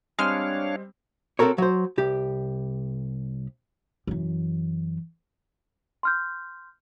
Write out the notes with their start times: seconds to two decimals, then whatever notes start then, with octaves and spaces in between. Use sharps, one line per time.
0.19 G3 G#3 C4 D4 C#5 F5 F6
1.39 C4 F#4 A4 A#4 C#5
1.58 F#3 C5
1.98 C2 G4
4.07 F#2 E3
6.03 C6 F6 G6